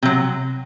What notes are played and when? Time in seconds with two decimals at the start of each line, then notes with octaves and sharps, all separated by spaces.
0.03 C3 F#3